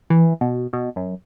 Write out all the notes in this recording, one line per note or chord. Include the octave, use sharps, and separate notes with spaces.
E3
B2
B2
F#2